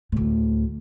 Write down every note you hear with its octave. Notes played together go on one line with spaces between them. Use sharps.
D2 A2